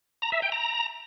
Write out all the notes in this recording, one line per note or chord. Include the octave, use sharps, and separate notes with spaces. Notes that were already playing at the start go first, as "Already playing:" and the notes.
A#5
E5
G5
A#5